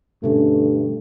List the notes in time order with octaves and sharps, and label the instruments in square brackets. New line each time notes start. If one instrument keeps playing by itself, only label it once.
[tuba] G2 [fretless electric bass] B2 D3 C#4 [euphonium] A3